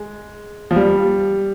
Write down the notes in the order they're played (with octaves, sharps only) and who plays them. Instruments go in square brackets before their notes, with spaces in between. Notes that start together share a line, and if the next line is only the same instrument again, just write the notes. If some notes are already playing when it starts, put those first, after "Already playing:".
Already playing: [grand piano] G#3
F3
G3